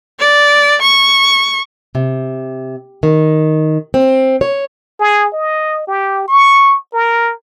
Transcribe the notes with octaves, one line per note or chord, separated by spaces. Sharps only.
D5
C#6
C3
D#3
C4
C#5
G#4
D#5
G4
C#6
A#4